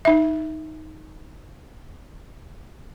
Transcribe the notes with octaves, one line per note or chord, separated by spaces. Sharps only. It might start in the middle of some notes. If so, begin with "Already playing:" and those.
D#4 E5